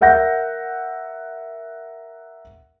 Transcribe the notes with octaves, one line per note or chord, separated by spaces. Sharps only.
A#4 E5 F#5 G6 A#6